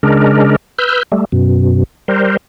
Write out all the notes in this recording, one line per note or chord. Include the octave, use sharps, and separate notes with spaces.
C#3 G#3 D4 A#4
B4 E6 F6 G6
G3 A3
F#2 B2
G3 A#4 C5